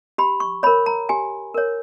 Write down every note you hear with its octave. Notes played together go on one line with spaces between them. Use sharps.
G4 B5
C#6
A#4 C#5 B5
A#5
G4 G#5
A#4 C#5